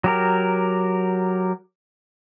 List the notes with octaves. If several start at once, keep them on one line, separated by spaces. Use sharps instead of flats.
F#3 G4 A#4